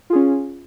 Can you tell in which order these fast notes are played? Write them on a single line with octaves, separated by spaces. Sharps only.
F4 G#4 C#4